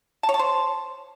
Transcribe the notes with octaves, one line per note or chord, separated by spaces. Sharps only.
A5
C#5
A5
C5